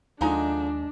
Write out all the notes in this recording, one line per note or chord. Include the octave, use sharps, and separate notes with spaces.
D#2 D3 F3 G#3 D4 D#4 A#5